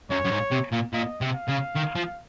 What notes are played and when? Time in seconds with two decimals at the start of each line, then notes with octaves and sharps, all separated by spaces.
0.10 F#2 C#5
0.24 F#2
0.31 G#2
0.52 C3
0.73 A#2
0.93 A#2 D#5
1.21 C3
1.34 F5
1.49 C#3
1.76 D#3
1.96 F3